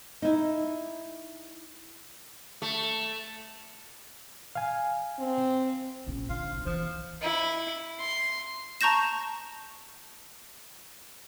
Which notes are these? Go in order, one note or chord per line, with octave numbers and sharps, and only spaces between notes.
D#4 E4
A3
F5 G#5
C4
A#1 C#4
D3 F4
B1 D#4
B1 E3 F3
E4
C6
A5 A#5 C#6 G6 A#6 E7